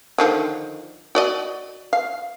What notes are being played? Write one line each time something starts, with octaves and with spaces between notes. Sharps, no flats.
D3 D#3 F3
F#4 D5 D#5
F5